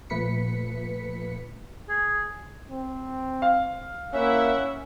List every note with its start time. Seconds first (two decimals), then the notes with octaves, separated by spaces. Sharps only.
0.10 A#2 F3 A3 B4 B6 C#7
1.89 G#4
2.70 C4
3.42 F5
4.14 A#3 C#4 E4 E5 F#5